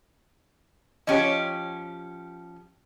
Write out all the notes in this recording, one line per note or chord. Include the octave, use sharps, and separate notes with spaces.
F3 C#4 G4 C#5 D#5